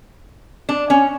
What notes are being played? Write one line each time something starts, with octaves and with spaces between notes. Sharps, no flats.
D4
C#4